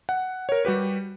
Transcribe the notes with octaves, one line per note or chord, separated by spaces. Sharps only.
F#5
A#4 C#5
G3 F#4 G4 B4